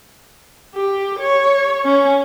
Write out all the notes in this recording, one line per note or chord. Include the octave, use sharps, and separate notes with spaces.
G4
C#5
C#4